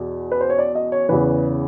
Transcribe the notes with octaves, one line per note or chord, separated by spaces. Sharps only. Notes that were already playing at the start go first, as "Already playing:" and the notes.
Already playing: E2 B2
B4
C5
C#5
D5
D#5
C#5
E2 C#3 E3 B4